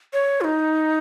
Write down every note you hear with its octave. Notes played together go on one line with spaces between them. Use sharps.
C#5
F4
D#4